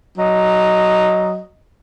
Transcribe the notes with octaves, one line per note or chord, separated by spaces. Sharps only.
F#3 D#5